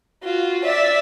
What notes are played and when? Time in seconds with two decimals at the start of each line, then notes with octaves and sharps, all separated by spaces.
0.23 F4 F#4
0.65 D5 E5